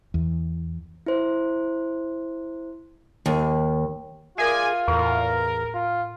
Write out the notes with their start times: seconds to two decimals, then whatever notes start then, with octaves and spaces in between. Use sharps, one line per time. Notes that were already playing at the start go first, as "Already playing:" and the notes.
0.14 E2
1.06 E4 C5
3.26 D#2
4.38 F4 G#4 A#4 D5 E5 G#5
4.88 E2 A2 A#4
5.74 F4